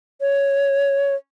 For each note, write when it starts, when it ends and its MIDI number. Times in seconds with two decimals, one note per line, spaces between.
0.21 1.15 73